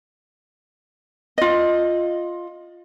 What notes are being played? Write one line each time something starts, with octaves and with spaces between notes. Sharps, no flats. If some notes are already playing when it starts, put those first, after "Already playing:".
F4 D#5